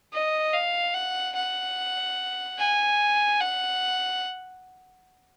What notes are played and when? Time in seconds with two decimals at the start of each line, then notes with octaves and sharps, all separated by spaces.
0.13 D#5
0.53 F5
0.94 F#5
1.35 F#5
2.59 G#5
3.40 F#5